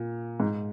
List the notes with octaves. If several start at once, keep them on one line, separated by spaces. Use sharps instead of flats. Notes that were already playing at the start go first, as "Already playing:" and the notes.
Already playing: A#2
G#2